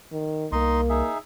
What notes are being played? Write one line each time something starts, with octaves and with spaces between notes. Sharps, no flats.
D#3
C2 A#3 D#4 D#5 C6
D#4 G#4 E5